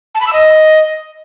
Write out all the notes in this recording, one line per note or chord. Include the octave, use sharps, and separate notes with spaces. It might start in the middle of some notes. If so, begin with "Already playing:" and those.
A5
B5
E6
D#5